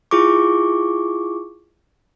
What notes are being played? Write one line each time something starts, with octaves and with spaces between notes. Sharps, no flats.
E4 F4 G#4 C#6 D6